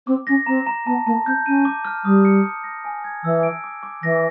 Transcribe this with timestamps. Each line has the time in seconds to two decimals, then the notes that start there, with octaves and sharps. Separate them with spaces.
0.07 C4 D6
0.27 C#4 A#6
0.46 C4 A#5
0.66 A#5
0.86 B3 A5
1.06 A#3 A5
1.26 C4 G6
1.46 C#4 D#7
1.65 D6
1.85 F6
2.04 G3 D#6
2.25 C#7
2.44 D6
2.64 A#6
2.85 G#5
3.04 G#6
3.23 E3 E6
3.43 D7
3.64 D6
3.83 D6
4.02 E3 A#6